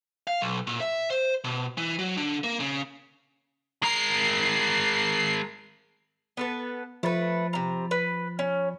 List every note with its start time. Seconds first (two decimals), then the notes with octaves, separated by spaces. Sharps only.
0.27 F5
0.41 B1
0.67 A#2
0.81 E5
1.10 C5
1.44 B2
1.78 E3
1.99 F#3
2.17 D3
2.44 A#3
2.60 C#3
3.83 G#3 A#4 C7
6.37 B3 A4 B4
7.03 F3 A3 B4 B5 A6
7.53 C3 A#5
7.91 B4
8.39 C#4